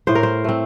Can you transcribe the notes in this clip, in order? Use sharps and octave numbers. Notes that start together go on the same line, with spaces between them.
A2 C5
A#4
C5
A3 C4